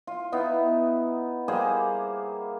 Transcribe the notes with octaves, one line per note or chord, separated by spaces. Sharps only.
F4
B3 D#4 E4
G3 A#3 G#4 C5